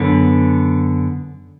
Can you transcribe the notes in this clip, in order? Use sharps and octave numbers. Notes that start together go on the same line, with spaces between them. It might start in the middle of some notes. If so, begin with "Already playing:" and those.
Already playing: F#2 D3 B3